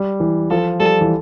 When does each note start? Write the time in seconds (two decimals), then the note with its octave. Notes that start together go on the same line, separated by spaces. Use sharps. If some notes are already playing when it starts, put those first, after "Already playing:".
Already playing: G3
0.20 E3
0.50 F3 A4
0.80 G3 A4
1.01 E3